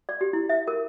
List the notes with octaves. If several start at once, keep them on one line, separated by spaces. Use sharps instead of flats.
D5
G4
E4
E5
A#4